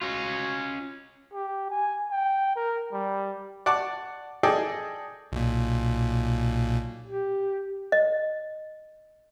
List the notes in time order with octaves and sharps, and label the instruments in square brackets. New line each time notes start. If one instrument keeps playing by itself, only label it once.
[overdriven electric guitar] C#4 F4 [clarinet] F#4
[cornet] G4
G#5
G5
A#4
G3
[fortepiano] D5 F#5 A5 C#6 D6
G#4 A4 D5 D#5 G5
[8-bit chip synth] B1 A#2
[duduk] G4
[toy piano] D#5